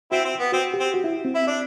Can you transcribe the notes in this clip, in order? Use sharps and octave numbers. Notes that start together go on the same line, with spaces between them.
C4 E4 F#4
C4
B3
C4 F#4
G4
C4
F#4
E4
C4
E4
D4